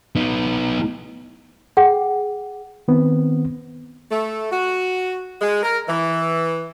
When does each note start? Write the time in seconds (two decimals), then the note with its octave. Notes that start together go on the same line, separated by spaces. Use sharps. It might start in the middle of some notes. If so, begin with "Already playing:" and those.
0.16 B3 D#4
1.77 G#4 F#5 G5
2.88 D#3 B3 C4
4.11 A3
4.52 F#4
5.41 G#3
5.63 A#4
5.88 E3